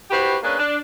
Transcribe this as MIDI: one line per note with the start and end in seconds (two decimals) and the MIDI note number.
0.11 0.36 64
0.11 0.36 66
0.11 0.36 67
0.11 0.36 71
0.11 0.36 72
0.43 0.58 58
0.43 0.58 61
0.43 0.58 62
0.43 0.58 68
0.43 0.58 71
0.60 0.78 62